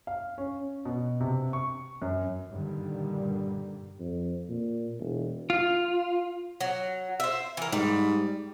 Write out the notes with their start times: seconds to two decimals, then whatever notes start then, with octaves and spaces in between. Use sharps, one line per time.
0.07 F5
0.38 C#4
0.85 B2
1.20 C3
1.53 C#6
2.02 F#2
2.51 G2 A#2 D3 D#3 G3
3.99 F2
4.49 A#2
4.99 E1
5.50 F4
6.61 F#3
7.20 C5 E5
7.57 E3 A#4
7.72 G#2 G3